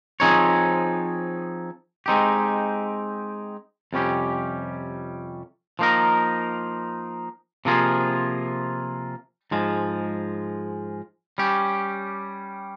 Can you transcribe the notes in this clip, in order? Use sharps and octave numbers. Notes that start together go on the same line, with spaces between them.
F3 C4 D#4 G#4 C#5
G#3 C4 D#4 G4
F2 C3 G3 C#4 G4
F3 A#3 D#4 A#4
C3 F3 A#3 F4 G#4
G#2 F3 G#3
G3 C#4 G4